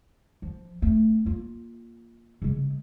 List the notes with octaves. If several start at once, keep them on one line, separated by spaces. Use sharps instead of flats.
F3
A3 C4
A#3 F4
C#3 G#3